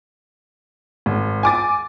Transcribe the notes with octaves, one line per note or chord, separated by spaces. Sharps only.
G#1
G#5 D6 A6